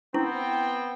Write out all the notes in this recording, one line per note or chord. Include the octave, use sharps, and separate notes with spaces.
B3 C4 E4 G5